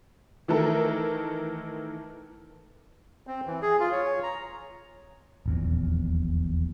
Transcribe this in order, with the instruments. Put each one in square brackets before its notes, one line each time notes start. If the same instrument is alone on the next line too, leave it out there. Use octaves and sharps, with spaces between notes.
[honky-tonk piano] D#3 E3 A3 A4 A#4
[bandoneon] C4
E3
G#4
F4
C#5
A#5
[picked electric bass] D#1 A#1 E2